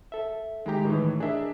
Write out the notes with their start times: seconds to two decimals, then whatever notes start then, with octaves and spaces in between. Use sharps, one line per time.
0.12 A4 E5
0.66 D#3 G#3 E4 G4 A#5
0.85 A2 D#3 E3
1.20 D4 G#4 A#4 D#5 E5